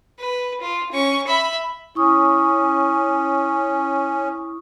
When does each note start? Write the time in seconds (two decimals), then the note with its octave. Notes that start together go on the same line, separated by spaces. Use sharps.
0.19 B4
0.61 F4
0.92 C#4 C#6
1.27 E5 B5
1.95 C#4 E4 C#6 D#6